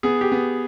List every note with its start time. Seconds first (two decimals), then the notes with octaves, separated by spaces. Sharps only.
0.03 B3 G#4
0.21 G4
0.32 B3